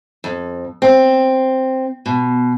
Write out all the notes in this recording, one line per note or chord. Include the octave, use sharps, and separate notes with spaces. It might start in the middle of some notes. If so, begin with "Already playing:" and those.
F2
C4
B2